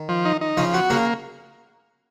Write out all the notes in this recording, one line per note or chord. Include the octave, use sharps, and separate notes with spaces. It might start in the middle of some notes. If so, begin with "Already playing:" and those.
Already playing: D#3
F3
D#4
D#4
C#3 F3 C#4
B3 F#4
C#3 A#3 C#4